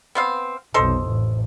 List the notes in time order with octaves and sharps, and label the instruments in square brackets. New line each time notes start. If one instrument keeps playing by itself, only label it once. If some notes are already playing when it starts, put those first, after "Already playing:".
[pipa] B3 C4 F5
[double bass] F1 B1 [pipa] D#4 A4 C5
[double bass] A1